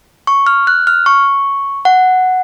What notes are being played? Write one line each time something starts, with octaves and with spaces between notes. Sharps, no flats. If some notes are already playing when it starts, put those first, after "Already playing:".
C#6
F6
F#6
F6
C#6
F#5